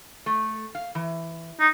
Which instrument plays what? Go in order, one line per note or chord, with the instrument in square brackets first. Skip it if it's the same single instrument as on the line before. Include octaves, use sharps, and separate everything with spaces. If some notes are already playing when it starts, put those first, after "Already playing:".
[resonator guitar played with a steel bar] A3
F5
E3
[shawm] D#4